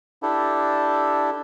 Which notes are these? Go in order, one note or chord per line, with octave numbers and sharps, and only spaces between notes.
D4 E4 G4 A4